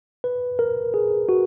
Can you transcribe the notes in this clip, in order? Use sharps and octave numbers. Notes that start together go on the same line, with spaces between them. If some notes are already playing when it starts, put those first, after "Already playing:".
B4
A#4
G#4
F#4